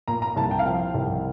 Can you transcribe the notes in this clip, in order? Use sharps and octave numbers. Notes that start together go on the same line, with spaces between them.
A#2 A#5
A#5
C2 A5
G5
F5
F3 G5
C2